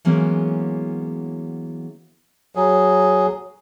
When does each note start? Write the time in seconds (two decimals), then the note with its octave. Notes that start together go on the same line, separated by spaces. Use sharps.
0.05 E3 F#3 G#3 A#3 B3 C#4
2.55 F#3 G#4